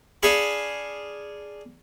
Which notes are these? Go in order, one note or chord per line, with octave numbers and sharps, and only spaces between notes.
D4 G#4 F5 B5 C#6